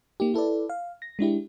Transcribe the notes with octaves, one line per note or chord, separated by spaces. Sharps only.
A#3 D#4 G4
E4 A4 B4 D5
F5
A#6
G#3 D4 E4 G4